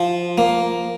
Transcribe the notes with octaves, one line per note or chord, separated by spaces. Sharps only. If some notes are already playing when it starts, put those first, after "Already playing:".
Already playing: F3
A#3